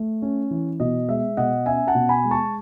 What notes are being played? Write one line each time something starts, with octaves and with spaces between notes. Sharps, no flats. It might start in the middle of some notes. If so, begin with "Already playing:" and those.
Already playing: A3
C#4
E3
B2 D#5
G#3 E5
B2 D#5 F#5
C#4 E5 G#5
F#5 A5
B2
G#5 B5
G#3
A5 C#6